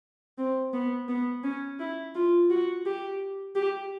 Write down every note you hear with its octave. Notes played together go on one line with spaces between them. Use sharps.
C4
B3
B3
C#4
E4
F4
F#4
G4
G4